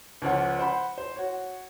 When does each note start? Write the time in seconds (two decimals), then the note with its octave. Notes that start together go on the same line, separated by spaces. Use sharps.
0.22 C#2 F3 C#5 F#5
0.59 C5 F#5 B5
0.98 C5
1.16 F#4 C#5